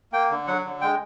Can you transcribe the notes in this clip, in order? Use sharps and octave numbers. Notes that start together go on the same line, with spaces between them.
A#3 G5
D3
F#3 F#5
D3
G#3 G5